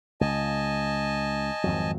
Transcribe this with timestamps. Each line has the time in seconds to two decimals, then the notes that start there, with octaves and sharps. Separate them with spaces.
0.21 C#2 D#5 G#5 A5
1.64 G#1 F2 F#3